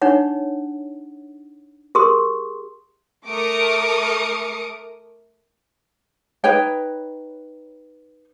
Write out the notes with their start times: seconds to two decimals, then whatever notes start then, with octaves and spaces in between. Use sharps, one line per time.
0.02 D4 D#4 C#5 F#5
1.95 G4 G#4 A#4 C6 D#6
3.27 A3 A#4 D6 D#6 C#7
6.44 D#4 B4 C#5 G5